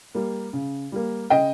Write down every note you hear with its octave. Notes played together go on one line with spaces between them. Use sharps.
G3 A#3
C#3
G3 A#3
C#3 D#5 G5